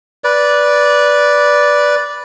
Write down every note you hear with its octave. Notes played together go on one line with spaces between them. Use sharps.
B4 D5